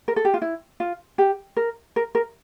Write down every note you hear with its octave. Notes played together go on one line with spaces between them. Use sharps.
A#4
A4
G4
F4
E4
F4
G4
A#4
A#4
A#4